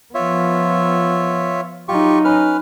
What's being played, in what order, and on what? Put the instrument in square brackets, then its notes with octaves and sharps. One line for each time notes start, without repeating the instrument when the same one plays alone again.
[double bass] F3 B3 [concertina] F4 C#5 E5
[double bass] F#3 D#4 [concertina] F4 G4 C#6
[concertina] C#4 B4 F6